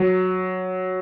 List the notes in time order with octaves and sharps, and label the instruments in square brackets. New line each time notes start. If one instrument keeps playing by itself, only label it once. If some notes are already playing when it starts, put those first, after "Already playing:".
Already playing: [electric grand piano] F#3